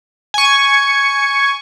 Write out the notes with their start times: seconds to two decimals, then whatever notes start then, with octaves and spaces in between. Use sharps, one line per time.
0.34 G#5 C#6